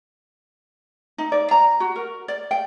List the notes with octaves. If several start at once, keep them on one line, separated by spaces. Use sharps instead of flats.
D#4
D5
A#5
F#4
A#4
D5
G5